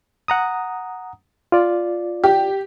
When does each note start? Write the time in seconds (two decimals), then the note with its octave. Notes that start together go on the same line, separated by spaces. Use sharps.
0.28 F#5 A#5 D#6
1.52 F4 D5
2.24 G4